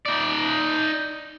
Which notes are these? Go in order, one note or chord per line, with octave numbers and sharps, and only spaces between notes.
D#4 D5